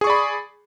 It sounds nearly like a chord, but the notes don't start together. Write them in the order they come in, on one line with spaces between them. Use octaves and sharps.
G#4 C#6 D5 B5